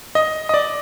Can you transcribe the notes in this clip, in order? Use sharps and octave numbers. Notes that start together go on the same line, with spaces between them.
D#5
D#5
D5